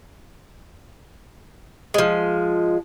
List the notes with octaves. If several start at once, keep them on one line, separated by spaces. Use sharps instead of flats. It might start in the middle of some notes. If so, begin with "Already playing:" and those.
F3 G#3